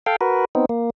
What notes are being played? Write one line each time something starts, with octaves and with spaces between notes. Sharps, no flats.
A4 F5 G5
F#4 A#4 B4
B3 C4 D#4
A#3